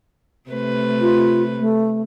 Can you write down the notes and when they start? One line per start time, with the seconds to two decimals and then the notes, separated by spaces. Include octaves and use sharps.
0.50 C3 A3 B4
1.01 F4
1.60 A3